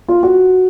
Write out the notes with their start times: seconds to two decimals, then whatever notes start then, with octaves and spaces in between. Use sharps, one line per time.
0.08 F4
0.23 F#4